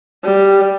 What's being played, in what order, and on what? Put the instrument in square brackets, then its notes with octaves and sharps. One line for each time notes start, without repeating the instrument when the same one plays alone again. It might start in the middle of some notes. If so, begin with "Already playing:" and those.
[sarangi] G3